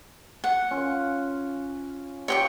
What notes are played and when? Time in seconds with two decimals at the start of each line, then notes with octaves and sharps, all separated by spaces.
0.44 F#5
0.71 C#4 F4
2.28 F4 G4 C#5 G5 C#6